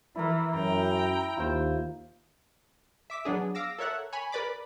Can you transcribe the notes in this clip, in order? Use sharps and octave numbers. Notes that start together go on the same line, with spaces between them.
E3 E4 A#4
F#2 G5 A#5
D#2 F4 C5
E5 D6 B6
F#3 B3 D4 G#4
F5 D6 E6 A#6
A4 A#4 C#5 E5 F#5
C#5 G#5 B5
A#4 B4 D5 B5 D6